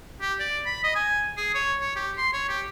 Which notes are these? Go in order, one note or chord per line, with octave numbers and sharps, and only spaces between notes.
G4
D5
B5
D#5
G#5
G#4
C#5
C#5
G4
C6
C#5
G4